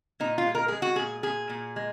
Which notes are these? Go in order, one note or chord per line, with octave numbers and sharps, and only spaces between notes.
A#2 D#4
F4
G#3
A#4
G#3 G#4
F#4
A#2 G#4
A#2 G#4
A#2
G#3